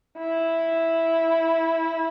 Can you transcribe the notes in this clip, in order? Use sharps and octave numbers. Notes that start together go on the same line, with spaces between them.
E4